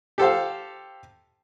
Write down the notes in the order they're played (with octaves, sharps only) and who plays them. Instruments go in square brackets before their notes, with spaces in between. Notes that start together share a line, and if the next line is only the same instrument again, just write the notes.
[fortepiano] G4 A4 C5 F5